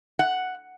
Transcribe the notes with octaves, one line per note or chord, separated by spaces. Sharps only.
F#5